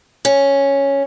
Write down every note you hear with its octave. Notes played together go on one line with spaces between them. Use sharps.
C#4